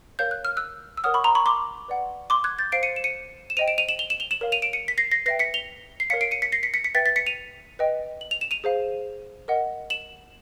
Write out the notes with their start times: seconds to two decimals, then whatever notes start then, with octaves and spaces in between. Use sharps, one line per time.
0.19 A#4 C#5 F5 G6
0.31 F#6
0.45 F6
0.57 E6 F#6
0.97 E6
1.04 A#4 C#5 F#5 D#6 F6
1.14 B5 C#6
1.24 A#5 C6
1.35 B5 C#6
1.46 C6 D6
1.88 B4 D5 F#5
2.30 C6 D6
2.44 F#6 G#6
2.59 G6 A6
2.72 C5 F5 C7 D7
2.83 C#7 D#7
2.96 E7
3.04 C#7 D#7
3.50 E7
3.57 C5 D#5 G5 D#7 F7
3.68 D7 E7
3.78 D#7 F7
3.89 E7 F#7
3.99 F7 G7
4.10 E7 F#7
4.20 F7 G7
4.31 E7 F#7
4.41 A#4 C#5 F5
4.52 D#7 F7
4.62 D7 E7
4.73 C#7 D#7
4.88 B6
4.98 A#6 C7
5.11 A#6 C7
5.26 B4 E5 G5 A#6 C7
5.39 B6 C#7
5.54 F7 G7
6.00 C7
6.10 A#4 C#5 F5 B6 C#7
6.21 C7 D7
6.31 C#7 D#7
6.42 B6 C#7
6.52 A#6 C7
6.63 B6 C#7
6.74 B6 C#7
6.84 B6 C#7
6.94 B4 E5 G5 A6 B6
7.06 A6 B6
7.16 B6 C#7
7.26 D#7 F7
7.79 B4 D#5 G5
8.21 F#7
8.31 F7
8.41 E7
8.51 D#7 F7
8.64 G#4 C5 F5
9.48 A#4 D#5 F#5
9.90 E7 F#7